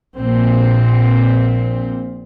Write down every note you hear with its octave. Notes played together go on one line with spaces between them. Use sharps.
A#1 A#2 C4